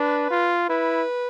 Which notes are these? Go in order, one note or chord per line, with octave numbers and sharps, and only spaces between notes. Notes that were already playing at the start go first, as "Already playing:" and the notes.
Already playing: D4 B4
F4
E4 B4